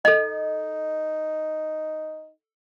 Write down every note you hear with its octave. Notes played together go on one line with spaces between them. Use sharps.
D#4 A4 D#5